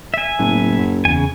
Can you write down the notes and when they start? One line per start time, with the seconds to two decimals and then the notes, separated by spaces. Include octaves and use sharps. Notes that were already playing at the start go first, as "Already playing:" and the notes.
0.14 E5 G#5
0.39 F#1 A2 F#3 B3
0.79 F#2
1.05 E2 C#3 G#5